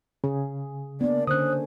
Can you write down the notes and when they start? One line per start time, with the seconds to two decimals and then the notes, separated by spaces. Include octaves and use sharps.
0.24 C#3 G#4
1.01 A#3 B3 D4 D5
1.27 D3 C#4 C5 D#6 F#6